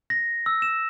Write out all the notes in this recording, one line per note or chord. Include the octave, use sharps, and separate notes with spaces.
A#6
E6
E7